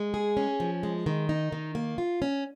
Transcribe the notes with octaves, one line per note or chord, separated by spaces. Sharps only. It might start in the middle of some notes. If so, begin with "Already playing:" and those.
Already playing: G#3
G#4
C#4
F3
G#3
D#3
D#4
D#3
A#3
F4
C#4